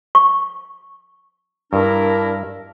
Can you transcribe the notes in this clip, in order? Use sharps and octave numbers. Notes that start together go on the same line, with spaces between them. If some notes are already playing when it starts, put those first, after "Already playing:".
C#6
G2 D4 E4 A#4